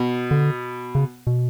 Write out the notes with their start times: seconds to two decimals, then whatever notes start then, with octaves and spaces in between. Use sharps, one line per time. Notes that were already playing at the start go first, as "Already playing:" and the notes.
Already playing: B2
0.31 D3
0.95 C#3
1.27 B2